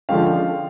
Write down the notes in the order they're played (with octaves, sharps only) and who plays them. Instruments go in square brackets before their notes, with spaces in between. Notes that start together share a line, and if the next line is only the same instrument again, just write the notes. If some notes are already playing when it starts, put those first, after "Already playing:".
[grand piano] D3 F3 G#3 C#4 F5 G5